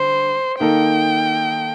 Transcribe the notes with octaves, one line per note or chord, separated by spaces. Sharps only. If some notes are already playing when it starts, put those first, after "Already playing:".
Already playing: D3 G3 C5
D#3 A#3 D#4 A4 G5